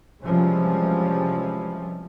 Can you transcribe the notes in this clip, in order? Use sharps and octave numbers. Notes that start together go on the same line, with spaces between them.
C3 E3 F3 G3 G#3 C#4